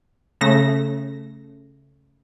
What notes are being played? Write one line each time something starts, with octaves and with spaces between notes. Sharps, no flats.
C#3 A3 A#6